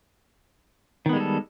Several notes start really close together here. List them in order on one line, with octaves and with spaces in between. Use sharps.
D#3 B3 G#3 G3 A4